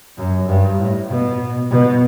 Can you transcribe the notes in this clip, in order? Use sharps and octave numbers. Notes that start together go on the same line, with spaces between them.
F#2
G2
A2
B2
B2